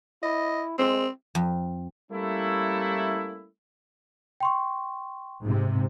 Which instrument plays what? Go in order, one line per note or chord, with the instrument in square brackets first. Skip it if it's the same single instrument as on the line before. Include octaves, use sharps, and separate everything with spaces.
[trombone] E4 [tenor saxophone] D#5
[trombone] G#3 [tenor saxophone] C4
[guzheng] F2
[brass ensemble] G3 A3 A#3 C#4 E4
[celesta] G5 C6 C#6
[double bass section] G#2 C3